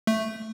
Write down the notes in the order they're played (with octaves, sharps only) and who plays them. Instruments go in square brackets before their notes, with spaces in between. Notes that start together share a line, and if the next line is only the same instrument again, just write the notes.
[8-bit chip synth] A3